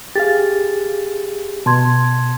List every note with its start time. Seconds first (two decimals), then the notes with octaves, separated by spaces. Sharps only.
0.15 G4 G#4 F5 A6
1.66 B2 A5 C6 G#6